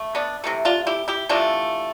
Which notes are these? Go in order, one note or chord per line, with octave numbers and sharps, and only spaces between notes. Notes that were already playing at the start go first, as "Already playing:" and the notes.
Already playing: A3
B3 D4
C3 E3 A3
D4 F4
E4 G4
E4 G4
C3 E3 A3 D4 F4